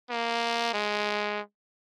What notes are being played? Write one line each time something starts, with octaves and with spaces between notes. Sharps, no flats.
A#3
G#3